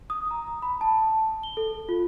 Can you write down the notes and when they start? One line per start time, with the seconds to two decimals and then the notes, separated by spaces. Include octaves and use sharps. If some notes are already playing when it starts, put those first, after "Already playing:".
0.10 D#6
0.31 A#5
0.62 B5
0.81 A5
1.43 G7
1.57 A4
1.89 F4